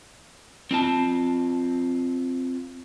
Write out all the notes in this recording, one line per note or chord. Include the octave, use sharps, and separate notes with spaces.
C4 F4 A5